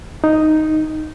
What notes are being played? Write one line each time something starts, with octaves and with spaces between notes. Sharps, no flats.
D#4